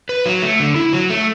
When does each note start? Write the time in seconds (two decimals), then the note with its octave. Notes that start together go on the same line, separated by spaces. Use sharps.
0.09 B4
0.26 F#3
0.42 A3
0.60 D3
0.76 E4
0.93 F#3
1.10 A3